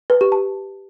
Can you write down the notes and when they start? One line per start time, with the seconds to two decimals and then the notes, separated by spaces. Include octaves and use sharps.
0.10 B4
0.21 G4
0.32 A5